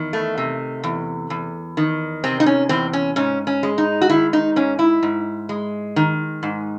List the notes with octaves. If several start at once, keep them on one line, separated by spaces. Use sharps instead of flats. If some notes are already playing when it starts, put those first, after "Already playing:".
Already playing: E2 D#3
A3
C3
E2
E2
D#3
C3 C4
D#4
C#4
E2 C4
C#4
G#2 C#4
C#4
G#3
D#4
F#4
D#3 E4
D#4
G#2 C#4
E4
G#2
G#3
D#3
G#2